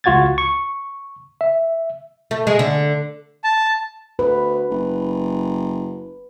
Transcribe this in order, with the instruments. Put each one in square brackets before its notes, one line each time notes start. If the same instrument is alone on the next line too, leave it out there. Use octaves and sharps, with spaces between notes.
[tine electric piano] C#2 F4 F#4 F#5 G#6 A6
C#6
E5
[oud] A3
G#3
D3
[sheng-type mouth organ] A5
[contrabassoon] D2 [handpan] B4
[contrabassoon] F#1